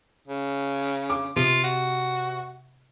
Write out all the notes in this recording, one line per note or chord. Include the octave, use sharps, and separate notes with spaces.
C#3
D6
C3 F4
F#4